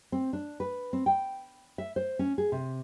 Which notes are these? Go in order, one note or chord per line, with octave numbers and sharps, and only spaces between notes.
C4
D4
B4
C4
G5
E5
C5
C#4
G#4
C3